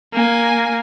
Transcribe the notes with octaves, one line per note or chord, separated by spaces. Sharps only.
A#3 G#5